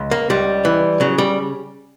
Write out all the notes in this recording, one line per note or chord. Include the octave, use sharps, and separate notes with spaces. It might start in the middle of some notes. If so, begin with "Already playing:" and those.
Already playing: C#2
A#3
C#2 G3
E3
C#3 F#3
G3